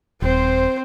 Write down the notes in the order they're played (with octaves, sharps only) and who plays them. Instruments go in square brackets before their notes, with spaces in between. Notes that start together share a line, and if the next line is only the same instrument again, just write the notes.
[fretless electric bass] D#1 [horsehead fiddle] C4 C5